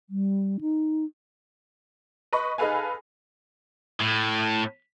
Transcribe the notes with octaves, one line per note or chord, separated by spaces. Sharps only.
G3
D#4
B4 D#5 B5 C#6
D#4 G#4 A4 B4 F5 G#5
A2